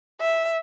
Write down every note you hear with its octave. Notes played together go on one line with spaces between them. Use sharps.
E5